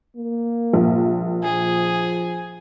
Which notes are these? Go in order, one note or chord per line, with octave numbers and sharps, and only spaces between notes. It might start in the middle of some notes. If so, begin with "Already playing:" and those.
A#3
A#1
F3 G#4